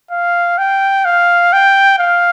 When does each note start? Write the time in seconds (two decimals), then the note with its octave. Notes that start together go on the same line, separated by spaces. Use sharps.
0.11 F5
0.58 G5
1.05 F5
1.53 G5
1.99 F5